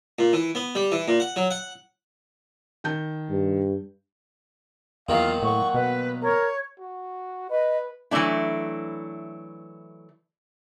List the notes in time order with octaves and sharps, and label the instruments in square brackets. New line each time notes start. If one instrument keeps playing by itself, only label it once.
[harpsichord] A#2
E3
B3
G3
E3
A#2
F#5
F#3
F#5
[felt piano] D#3 A5 G6
[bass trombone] G2
[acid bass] E2 [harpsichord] A#2 D#3 F#3 [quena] F4 [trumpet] F5
[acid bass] A2 [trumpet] F#5 [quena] C#6
[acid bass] B2 [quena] B4
[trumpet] A#4 [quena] C#5
[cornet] F#4
[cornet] B4 [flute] D#5
[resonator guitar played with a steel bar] E3 F#3 G3 A3 D4 E4